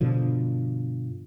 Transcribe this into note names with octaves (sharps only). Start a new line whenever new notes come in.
G2 B2 D3 F3